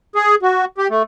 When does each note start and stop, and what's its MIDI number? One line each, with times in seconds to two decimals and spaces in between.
0.16 0.35 68
0.42 0.65 66
0.78 0.88 67
0.90 1.03 57